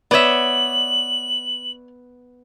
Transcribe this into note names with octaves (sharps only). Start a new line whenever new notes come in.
B3 C#5 D5 E5 F#7